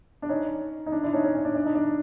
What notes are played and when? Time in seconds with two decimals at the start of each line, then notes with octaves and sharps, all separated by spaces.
0.22 D4
0.29 C#4 D#4
0.86 D#4
0.92 D4
1.03 D4 E4
1.13 C#4 D#4
1.24 C#4
1.35 C#4
1.45 D4
1.55 D4
1.65 D#4
1.75 D4